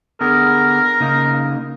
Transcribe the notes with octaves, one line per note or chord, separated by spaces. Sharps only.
D3 B3 G#4 A#4
C#3 A#3 D#4